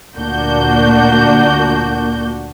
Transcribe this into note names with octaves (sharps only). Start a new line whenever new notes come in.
D2 A#2 A#3 D4 F#4 G6